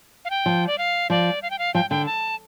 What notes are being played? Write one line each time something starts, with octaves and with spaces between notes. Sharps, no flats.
F5
G5
F3
D5
F5
F3 D5
F5
G5
F5
F3 G5
D3 G5
A5